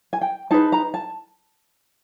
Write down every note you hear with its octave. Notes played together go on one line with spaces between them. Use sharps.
G#5
G5
D#4 G#4 B4 A5
A#5
A5